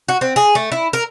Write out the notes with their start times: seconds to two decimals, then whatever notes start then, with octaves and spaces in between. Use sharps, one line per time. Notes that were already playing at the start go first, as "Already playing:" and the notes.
0.08 F#4
0.21 C4
0.36 G#4
0.55 A3
0.72 E4
0.93 A#4